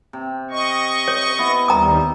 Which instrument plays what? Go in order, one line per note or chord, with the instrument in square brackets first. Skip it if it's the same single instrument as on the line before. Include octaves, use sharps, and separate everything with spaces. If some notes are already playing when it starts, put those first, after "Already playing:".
[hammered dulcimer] C3
[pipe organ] D#5 C#6
[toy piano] C#5
[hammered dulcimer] B3 E4
[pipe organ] D#2 G3 [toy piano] A#5 D#6